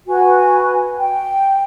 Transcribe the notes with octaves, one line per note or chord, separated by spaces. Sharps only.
F#4 B4 G#5
G5